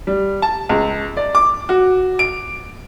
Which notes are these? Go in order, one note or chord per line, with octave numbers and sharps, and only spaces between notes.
G3
A5
C#2
D5
D6
F#4
D7